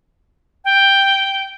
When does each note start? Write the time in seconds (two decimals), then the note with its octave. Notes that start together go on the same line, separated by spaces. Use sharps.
0.65 G5